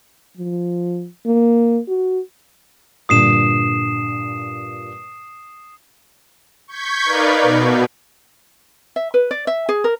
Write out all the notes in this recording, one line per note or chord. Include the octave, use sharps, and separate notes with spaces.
F3
A#3
F#4
G2 A#2 D3 D#6 C7 E7
C#6 G6 G#6 B6
D#4 A#4 B4 D5 F5
B2
E5
B4
D5
E5
G#4
A#4